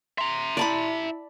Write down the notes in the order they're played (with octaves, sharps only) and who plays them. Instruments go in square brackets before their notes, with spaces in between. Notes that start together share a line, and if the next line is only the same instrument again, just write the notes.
[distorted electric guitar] E5 A#5 [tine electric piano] C6
[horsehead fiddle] E4 [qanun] D5 A5 B5